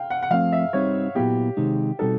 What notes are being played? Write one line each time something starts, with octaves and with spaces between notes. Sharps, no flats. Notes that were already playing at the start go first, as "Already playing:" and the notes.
Already playing: F5 G5
F#5
F#5
F3 A3 C4 F5
E5
G3 C4 D#4 C#5
A#2 F#3 B3 E4 G4
C3 D#3 G#3 C4 D#4
B2 G3 C4 D#4 F#4 A4